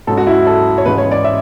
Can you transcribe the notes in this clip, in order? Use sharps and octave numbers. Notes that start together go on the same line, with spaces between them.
G#2 F#3 C#4 A4
F#4
E4
A4
C#5
G#2 E3 G#3 C#4 B4
C#5
D5
E5